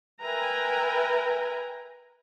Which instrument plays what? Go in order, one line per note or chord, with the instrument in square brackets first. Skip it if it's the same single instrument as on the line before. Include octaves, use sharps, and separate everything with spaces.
[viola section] A#4 B4 E5 G5 G#5 A#5